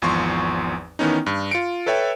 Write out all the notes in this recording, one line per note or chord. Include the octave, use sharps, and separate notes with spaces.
G#1 E2 F3 C6 C#6
D#3 E3 B3 C#4 D#4
G2
F4 C#7 D7
A4 B4 C#5 E5 G5